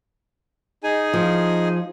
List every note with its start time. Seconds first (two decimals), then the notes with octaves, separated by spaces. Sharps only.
0.83 D#4 G#4 G#5
1.13 F3